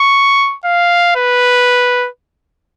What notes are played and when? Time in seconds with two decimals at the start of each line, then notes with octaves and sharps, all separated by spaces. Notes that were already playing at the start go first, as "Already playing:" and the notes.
Already playing: C#6
0.65 F5
1.16 B4